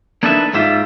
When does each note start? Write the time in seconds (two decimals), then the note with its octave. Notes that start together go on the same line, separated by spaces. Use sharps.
0.23 A#3 D4 D#4 A4 B4 E5
0.54 G#2 G3 F4 E5